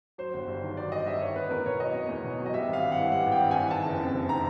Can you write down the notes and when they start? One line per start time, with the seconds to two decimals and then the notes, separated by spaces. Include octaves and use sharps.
0.18 F#3 C5
0.34 G1
0.48 G2
0.62 D#3
0.77 F#3 D5
0.91 G1 D#5
1.06 G2 E5
1.21 D#3 C#5
1.36 B3 B4
1.50 E2 A#4
1.66 B2 C#5
1.80 F#3 D#5
1.94 B3
2.09 E2
2.25 B2
2.39 F#3
2.46 D#5
2.54 G3 E5
2.68 G#1
2.73 F5
2.83 G2
2.92 F#5
2.97 E3
3.11 G3 F#5
3.26 G#1
3.32 G5
3.41 G2
3.51 E3 G#5
3.71 D#3 A5
3.86 F#1
3.99 F2
4.15 C3
4.29 D#3 A#5